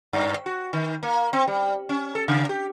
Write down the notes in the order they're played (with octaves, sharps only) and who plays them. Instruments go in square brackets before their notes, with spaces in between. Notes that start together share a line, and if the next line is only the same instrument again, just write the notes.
[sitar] G2
F#4
D#3
A#3
C4
G3
C#4
A4
C#3
G4